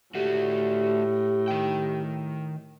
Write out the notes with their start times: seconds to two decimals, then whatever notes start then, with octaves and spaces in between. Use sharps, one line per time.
0.15 A2 A3 F#4 G4
1.48 D#3 G5